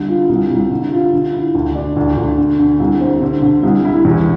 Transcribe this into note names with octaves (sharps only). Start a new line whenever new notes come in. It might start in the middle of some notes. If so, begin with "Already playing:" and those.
Already playing: C2 D3
F4
C2
C2
D3
F4
D3
E4
D2
D4
D2
D2
D3
D3
C2
C4
D3
D3
C2
E4
E2